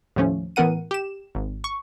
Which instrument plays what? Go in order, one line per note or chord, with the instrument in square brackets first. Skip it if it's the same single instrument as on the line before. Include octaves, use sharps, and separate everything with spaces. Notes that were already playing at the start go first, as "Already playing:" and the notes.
[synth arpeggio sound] D#2 A2 F3 A3 C#4
A2 E3 B3 A#4 F#5 D#7
G4 E7
G#1
C#6